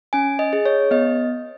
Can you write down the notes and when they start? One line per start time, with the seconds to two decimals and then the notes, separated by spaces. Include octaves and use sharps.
0.13 C#4 G#5
0.39 D#5
0.53 G#4
0.66 C#5
0.91 B3 D#5